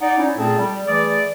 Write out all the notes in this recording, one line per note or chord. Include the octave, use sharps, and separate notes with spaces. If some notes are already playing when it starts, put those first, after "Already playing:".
D#4 D5 F#5
C#4 D#4 E4
A#2 A3 C4 G#4 A4 A5
G3
E3 A3 G#4 D5